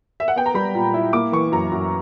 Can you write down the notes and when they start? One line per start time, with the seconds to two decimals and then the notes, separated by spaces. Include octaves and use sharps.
0.20 E5
0.28 F#5
0.36 B3 G5
0.46 A#5
0.54 G3 B5
0.75 A#2
0.94 E4
1.13 A#3 D6
1.32 E3 C#6
1.52 F#2 A#5
1.72 F#2